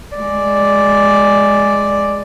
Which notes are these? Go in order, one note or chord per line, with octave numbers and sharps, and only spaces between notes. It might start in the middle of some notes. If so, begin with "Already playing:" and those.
G#3 D5